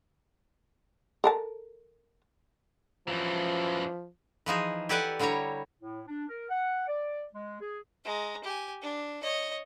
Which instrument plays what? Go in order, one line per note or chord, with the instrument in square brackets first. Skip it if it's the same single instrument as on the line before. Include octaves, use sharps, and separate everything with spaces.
[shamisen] A4 A#4 A5
[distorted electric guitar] F#2 E3 [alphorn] F3
[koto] E3 F3 D#4 G#4
G4 A4 B4 D5 F#5 G#5
D3 G3 E4 C#5 A#5
[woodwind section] A2
D4
A#4
F#5
D5
G#3
G#4
[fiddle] G#3 A#5
G4 G#5
D4
C#5 D#5